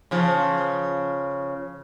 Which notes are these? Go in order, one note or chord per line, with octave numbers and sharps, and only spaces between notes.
C#3 F3